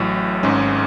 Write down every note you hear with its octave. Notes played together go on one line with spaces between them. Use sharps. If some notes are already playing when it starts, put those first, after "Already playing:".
Already playing: A1 A2 F#3
G#1 G#2 G#3 C#4